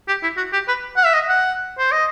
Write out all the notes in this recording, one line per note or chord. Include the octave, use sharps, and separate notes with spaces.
G4
E4
F#4
G4
B4
F#5
E5
D#5
F#5
C5
D#5